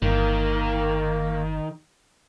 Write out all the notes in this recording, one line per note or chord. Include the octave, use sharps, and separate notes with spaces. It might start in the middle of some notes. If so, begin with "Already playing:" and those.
G1 D#3 A#3